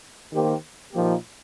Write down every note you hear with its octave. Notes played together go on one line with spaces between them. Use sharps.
D#3 A#3 G4 C5
A#2 F3 A#3 D#4 G4